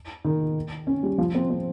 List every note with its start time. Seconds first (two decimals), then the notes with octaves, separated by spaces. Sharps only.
0.25 D#3
0.87 C#4
1.03 G3
1.18 F3
1.35 C4
1.50 C4